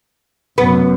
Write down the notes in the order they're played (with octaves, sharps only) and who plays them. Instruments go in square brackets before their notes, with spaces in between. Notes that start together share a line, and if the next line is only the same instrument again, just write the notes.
[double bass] F1 F#2 [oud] B3